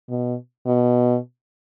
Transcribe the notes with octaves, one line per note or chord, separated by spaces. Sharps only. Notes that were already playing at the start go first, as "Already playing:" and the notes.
B2
B2